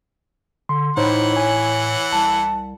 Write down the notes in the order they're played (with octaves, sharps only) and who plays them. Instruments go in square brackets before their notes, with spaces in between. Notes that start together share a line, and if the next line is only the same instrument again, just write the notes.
[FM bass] D3 [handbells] C6
[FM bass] A2 [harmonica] E3 F#5 [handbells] D#4 C5 C#5
[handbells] C#5 G#5
[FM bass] C2 [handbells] A5